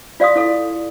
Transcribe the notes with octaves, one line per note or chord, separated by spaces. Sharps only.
F4 D5 F5 C6 D#6
E4 A4 F5